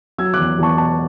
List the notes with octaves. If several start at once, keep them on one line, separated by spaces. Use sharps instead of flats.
F#3 E6 G#6
D6 F#6
E2
E2 A5 C#6
B2 A5 C#6